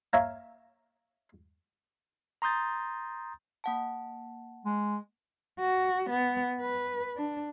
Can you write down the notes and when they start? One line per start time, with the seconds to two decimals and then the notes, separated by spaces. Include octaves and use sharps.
0.13 A#3 A#4 C#5 E5 F5 A#5
2.42 A#5 C6 D#6 G6 A6
3.64 A#3 F#5 A5
4.65 G#3
5.60 F#4
6.10 B3
6.61 B4
7.16 D4